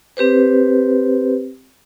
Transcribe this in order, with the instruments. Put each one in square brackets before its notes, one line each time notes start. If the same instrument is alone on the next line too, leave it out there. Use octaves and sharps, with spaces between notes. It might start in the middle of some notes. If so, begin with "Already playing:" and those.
[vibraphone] C4 G4 B4 C5